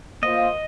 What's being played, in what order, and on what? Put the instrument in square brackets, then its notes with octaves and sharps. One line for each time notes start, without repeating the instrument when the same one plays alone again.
[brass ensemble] A#3 F4 C5 F5 [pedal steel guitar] D#5